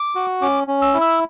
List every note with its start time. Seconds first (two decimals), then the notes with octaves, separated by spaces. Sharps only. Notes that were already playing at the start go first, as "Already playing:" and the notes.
Already playing: D6
0.15 F#4
0.41 C#4 D6
0.68 C#4
0.82 E6
0.94 E4
1.01 E6